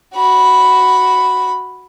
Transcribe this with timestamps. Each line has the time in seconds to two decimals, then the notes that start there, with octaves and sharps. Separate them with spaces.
0.15 F#4 B5